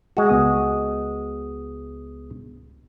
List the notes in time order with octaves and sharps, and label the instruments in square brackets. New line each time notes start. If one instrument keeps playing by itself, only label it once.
[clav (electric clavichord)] G#3 F#4
[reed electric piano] C#2 B3 D#6